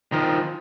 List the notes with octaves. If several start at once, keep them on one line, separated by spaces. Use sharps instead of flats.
D#3 F3